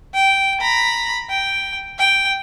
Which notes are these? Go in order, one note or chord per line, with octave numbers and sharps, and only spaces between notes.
G5
A#5 B5
G5
G5